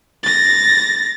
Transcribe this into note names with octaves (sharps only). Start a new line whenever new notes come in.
A6 A#6